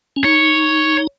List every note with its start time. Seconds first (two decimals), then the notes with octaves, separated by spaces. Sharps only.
0.16 C#4
0.24 D#4 C#5